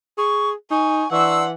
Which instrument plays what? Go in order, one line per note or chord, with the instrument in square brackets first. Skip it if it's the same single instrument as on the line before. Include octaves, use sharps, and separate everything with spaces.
[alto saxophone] G#4 [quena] C#6
[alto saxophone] D#4 [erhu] G#5 [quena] C#6
[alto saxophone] E3 [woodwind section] D4 C6 E6 [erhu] F#5 [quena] C#6